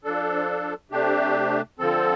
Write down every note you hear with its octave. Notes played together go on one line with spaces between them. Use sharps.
F3 D4 A4
C3 A3 D4 G4
D3 F3 C4 A4